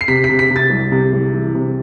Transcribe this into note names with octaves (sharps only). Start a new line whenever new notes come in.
C7
C3 B6
B6
C3
B6
C3
A6
C2
C3
C2
E3
C3